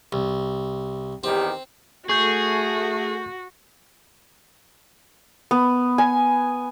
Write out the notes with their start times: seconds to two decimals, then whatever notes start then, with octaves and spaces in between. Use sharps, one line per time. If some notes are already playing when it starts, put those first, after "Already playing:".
0.12 C2
1.24 E2 D#3 C4 G4
2.09 A3 F#4 G#4 C#6 G6
5.51 B3
5.98 G#5